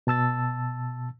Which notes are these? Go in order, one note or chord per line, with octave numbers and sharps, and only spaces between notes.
B2 A5 E6 A6